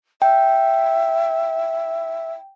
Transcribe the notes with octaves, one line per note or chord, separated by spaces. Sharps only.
E5 G5